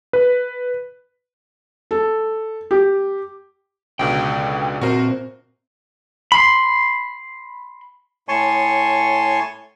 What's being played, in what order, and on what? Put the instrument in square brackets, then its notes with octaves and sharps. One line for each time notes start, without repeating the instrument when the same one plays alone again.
[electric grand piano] B4
[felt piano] A4
G4
[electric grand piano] C#2 B2 D3 [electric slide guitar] G5
[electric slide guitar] A#2 C4 C5 [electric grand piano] F#4 A#4
[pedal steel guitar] B5 C6
[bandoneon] A2 C#5 G#5 A5 C6 C#6